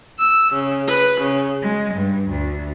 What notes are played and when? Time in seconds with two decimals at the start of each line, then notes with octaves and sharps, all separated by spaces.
0.18 E6
0.53 C#3
0.87 B4
1.21 C#3
1.62 G#3
1.95 G2
2.30 D2